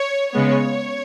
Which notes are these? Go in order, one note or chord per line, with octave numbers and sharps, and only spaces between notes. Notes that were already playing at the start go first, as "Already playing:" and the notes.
Already playing: C#5
C#3 G#3 B3 C#5